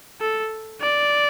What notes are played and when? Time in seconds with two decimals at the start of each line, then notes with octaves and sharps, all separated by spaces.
0.21 A4
0.82 D5